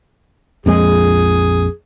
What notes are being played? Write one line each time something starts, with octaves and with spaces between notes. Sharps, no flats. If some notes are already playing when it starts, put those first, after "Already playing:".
A#1 F2 G#3 G#4